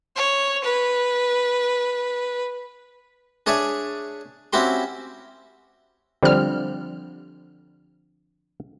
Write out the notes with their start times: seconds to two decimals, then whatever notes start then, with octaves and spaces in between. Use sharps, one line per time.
0.16 C#5
0.64 B4
3.46 D4 G#4 C#5 D5 E5 G#5
4.53 C4 C#4 E4 F#4 G4 C6
6.23 D3 F3 G3 C4 F6